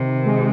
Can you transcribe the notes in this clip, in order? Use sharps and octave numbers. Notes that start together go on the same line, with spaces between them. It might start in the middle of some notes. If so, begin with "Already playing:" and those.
Already playing: C3 D#3
G#3